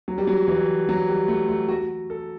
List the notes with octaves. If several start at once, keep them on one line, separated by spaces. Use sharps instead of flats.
F#3
G3
F#3
E3
F#3
G3
A3
A3
F#4
A4